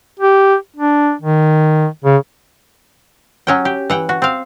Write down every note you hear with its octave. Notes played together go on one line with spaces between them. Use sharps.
G4
D4
D#3
C#3
F#3 C#4 G5
G4
E3 F#5 G5
F#4
C4 F5